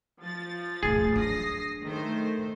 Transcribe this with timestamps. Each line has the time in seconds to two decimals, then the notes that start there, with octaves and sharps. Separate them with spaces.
0.21 F3 A6
0.83 D1 A1 G#4
1.16 F#3 D4 D#6 A#6 C7
1.82 D#3 A3 C5